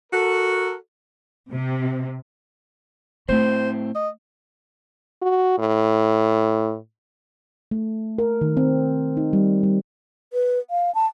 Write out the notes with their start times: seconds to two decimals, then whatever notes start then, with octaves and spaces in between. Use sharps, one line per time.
0.12 F#4 A4 A#4
1.52 C3
3.29 A2 A3 C4 C5
3.95 D#5
5.22 F#4
5.58 A2
7.71 A3
8.18 A#4
8.41 D#3
8.57 C4
9.17 D#4
9.33 G3
9.63 G3
10.33 B4
10.70 F5
10.95 A5